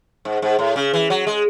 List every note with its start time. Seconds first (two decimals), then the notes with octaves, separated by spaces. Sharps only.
0.25 G#2
0.42 G#2
0.59 A2
0.76 C#3
0.94 E3
1.10 F#3
1.27 G#3